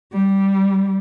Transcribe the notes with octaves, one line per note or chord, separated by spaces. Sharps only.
G3